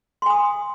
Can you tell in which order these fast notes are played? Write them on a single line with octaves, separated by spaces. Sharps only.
C6 G#5 D#6